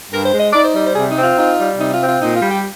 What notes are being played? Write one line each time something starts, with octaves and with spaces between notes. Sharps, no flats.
G2 A#4
C5
G#3
D#5
D#4 D5
C5
G3 D#5
C5
C3 G#4
D#4
C4
F4
D#4 F4
G3
C3 D#4
F4
C4
F4
A#2 D#4
F4
G3
G4